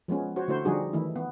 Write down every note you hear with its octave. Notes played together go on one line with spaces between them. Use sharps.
F3 G#3 B3 C#4
F#4 C5 C#5
D3 A3 E4 F#4 C5
D3 F3 G3 D#4 F#4 G#4
D#3 E3 A3 E4
B3